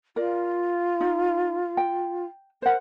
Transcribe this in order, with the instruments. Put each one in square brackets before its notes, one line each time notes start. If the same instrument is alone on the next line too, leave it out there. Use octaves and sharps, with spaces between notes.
[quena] F4 [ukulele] A#4 D5
[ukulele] D#4
G5
[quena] A#4 [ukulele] C5 F#5